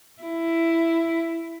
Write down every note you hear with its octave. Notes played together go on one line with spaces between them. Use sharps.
E4